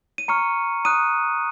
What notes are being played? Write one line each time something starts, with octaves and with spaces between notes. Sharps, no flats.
D#7
A#5 C#6 F6 C#7
A#5 D#6 F#6 D#7